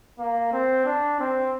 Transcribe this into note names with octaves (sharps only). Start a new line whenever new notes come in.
A#3
C4
D4
C4